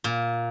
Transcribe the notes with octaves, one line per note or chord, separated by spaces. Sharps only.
A#2